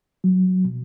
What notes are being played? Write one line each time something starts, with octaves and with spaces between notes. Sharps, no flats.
F#3
B2